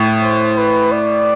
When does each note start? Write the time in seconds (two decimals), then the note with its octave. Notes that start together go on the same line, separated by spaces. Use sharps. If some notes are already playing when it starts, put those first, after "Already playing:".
Already playing: A2
0.23 C5
0.58 B4
0.92 D5